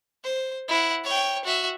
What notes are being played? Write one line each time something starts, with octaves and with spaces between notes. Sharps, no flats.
C5
E4 F#5
C#5 G5
F#4 E5